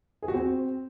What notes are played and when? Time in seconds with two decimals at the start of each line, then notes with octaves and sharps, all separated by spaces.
0.22 G#4
0.28 F#4
0.34 C4